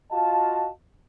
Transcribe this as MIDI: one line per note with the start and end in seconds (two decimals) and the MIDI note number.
0.11 0.69 65
0.11 0.69 66
0.11 0.69 75
0.11 0.69 77
0.11 0.69 81